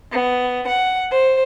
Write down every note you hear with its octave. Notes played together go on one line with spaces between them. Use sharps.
B3
F#5
C5